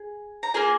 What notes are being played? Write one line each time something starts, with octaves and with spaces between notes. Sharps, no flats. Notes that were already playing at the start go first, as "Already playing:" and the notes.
Already playing: G#4
A#5
A#3 F4 G#4 G#5